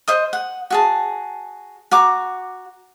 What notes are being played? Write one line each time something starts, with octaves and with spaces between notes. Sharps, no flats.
C5 D#5 D#6
F#5
F#4 G#4 A5
F#4 A#5 D6